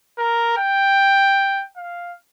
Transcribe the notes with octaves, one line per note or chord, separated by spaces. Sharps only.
A#4
G5
F5